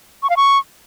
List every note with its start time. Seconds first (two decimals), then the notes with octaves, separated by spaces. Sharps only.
0.23 C#6
0.30 F5
0.37 C#6